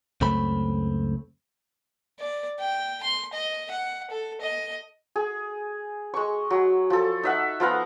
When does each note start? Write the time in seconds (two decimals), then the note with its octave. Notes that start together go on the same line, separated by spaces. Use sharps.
0.21 C#2 F#2 A3 C4 B5
2.19 D5
2.60 G5
3.03 C6
3.34 D#5
3.71 F#5
4.11 A4
4.41 D#5
5.16 G#4
6.14 G#3 C#6
6.50 F#3
6.90 F3 A4
7.23 D#4 E5 F#5
7.60 F3 B3 F5 A#5